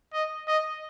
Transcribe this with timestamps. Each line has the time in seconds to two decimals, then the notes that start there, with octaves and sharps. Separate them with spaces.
0.13 D#5
0.47 D#5